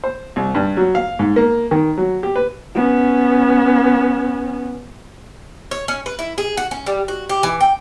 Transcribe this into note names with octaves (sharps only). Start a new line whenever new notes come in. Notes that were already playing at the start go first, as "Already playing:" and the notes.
C5
C2
G2
F#3
F5
G#2
A#3
D#3
F#3
G4
B4
B3 C#4
C#5
C#4
B4
E4
G#4
F#4
C#4
G3
F#4
G4
E3
G5